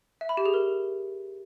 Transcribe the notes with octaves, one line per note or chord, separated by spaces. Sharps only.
E5
B5
G4
G#4
A#4